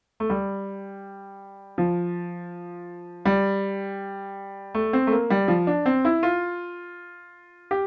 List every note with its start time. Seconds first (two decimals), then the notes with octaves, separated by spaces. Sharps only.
0.20 A3
0.30 G3
1.78 F3
3.25 G3
4.74 A3
4.93 C4
5.07 A3
5.12 A#3
5.30 G3
5.48 F3
5.67 D4
5.86 C4
6.05 E4
6.23 F4
7.71 G4